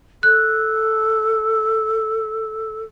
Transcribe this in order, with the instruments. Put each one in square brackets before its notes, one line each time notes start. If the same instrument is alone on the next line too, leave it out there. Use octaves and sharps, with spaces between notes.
[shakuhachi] A4 [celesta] F#6